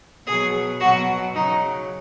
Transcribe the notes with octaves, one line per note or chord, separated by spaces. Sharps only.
B2 F#3 G#4
B2 F#3 F#4
C#3 F#3 D#4